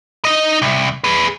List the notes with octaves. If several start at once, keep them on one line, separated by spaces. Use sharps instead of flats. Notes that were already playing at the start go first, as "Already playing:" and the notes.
D#4 D#5
C2
G#4 B4